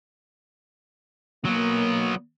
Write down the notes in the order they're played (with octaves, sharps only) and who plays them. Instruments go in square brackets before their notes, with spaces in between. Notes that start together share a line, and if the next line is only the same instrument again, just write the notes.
[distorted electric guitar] F#3 B3 [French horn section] A#3